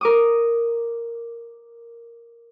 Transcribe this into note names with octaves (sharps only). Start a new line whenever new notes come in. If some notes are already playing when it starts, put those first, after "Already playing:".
A#4 D6 D#6